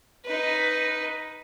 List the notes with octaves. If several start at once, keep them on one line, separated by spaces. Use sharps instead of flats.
D#4 B4